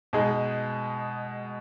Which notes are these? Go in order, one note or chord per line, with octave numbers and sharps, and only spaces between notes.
B2 G#3 D#4 G#4